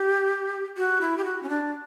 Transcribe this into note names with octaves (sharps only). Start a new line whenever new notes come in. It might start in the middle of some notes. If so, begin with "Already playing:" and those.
Already playing: G4
F#4
E4
G4
F#4
C#4
D4